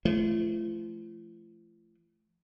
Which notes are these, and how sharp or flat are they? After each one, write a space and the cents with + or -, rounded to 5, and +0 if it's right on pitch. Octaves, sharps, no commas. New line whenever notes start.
F3 -45 A3 -25